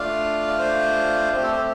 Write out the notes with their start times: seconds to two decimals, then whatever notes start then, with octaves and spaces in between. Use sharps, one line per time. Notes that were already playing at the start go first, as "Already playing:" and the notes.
Already playing: A3 D4 F4 F5
0.47 D5
0.59 C5
1.33 A3 C4 G4 C5
1.43 A4
1.52 C5